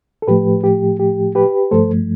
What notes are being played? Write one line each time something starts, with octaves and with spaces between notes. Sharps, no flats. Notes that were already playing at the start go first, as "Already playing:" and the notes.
A4
A2 F3 A3 G4 B4
G4
G4
G4 B4
G2 F3 A3 A4 C5